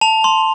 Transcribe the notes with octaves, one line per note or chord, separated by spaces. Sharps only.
A5 F7
C6